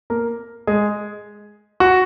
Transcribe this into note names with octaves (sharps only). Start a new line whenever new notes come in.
A#3 A#4
G#3 G#4
F#4